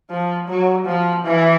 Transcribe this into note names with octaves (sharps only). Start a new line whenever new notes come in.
F3
F#3
F3
E3